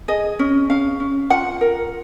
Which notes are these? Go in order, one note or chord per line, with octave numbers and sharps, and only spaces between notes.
G#4 D#5
C#4
C#4 F5
C#4
F4 F#5
A#4